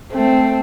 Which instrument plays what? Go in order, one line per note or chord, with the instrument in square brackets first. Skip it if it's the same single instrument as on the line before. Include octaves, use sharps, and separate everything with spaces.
[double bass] A3 [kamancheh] C4